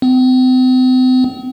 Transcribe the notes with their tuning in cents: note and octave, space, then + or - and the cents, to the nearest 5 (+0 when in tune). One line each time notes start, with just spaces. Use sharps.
C4 -40